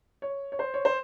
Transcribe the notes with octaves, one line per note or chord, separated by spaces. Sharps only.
C#5
C#5
C5
C#5
C5